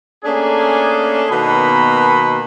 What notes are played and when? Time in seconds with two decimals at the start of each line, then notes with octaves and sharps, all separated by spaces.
0.25 A3 A#3 C#4 D4 G#4
1.30 B2 D#3 A#3 B3 B5